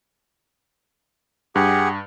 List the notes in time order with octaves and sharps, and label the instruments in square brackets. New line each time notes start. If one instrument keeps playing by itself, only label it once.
[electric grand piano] G2 [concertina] G4 G#4 F#5